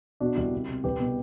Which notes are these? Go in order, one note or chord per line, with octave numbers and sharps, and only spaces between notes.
B2 D4 F#4
C2 E4 G4
C3
C3
C2 G4 B4
B2